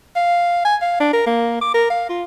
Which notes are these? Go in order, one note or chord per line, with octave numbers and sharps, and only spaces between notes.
F5
G#5
F5
D4
A#4
A#3
D6
A#4
F5
F4